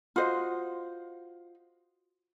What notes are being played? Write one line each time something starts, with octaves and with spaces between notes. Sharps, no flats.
F4 F#4 C5 D#5